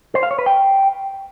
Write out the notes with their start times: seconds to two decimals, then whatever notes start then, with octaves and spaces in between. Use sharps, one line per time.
0.15 C5
0.23 F5
0.31 C#5
0.39 B4
0.46 G5